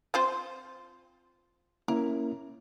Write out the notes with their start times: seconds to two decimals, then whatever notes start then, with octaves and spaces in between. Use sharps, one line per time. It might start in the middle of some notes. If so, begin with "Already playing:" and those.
0.14 C4 F4 C5
1.88 A#3 C#4 E4 A#4